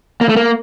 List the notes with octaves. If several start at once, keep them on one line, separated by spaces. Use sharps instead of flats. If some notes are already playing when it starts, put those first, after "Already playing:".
A#3
A3
A#3